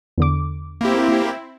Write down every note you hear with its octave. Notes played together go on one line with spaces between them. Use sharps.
E2 D3 D6
A#3 C4 E4 G4